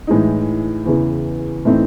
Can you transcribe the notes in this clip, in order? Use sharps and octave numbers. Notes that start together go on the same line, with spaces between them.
A2 E3 G#3 D#4
E2 C#3 E3
A2 E3 A3 C4 D#4